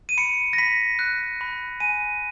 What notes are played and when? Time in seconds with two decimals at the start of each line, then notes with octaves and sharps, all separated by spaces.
0.09 D#7
0.18 B5 C#7
0.53 A#6
0.58 B5 B6
0.99 F#6
1.41 B5
1.80 G#5 D#7